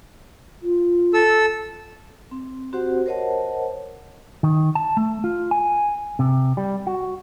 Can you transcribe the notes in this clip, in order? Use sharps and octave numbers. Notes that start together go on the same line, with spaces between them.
F4
A4 E6
C4
C4 F#4 G4 C5 F#5
A#4 C5 C#5 D#5 F#5 A5
D#3
A5
A3
F4
G#5
C3
G3
F#4